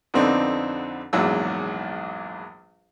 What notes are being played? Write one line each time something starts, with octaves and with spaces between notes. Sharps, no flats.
F2 D3 B3 C4 D4 D#4
A#1 E2 G#2 F#3 E6